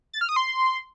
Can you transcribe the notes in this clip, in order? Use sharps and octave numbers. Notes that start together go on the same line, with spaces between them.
A6
F6
D#6
C6